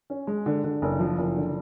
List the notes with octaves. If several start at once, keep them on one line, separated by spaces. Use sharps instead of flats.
C#4
G#3
D3
D3
F#1
F3
F#1
D3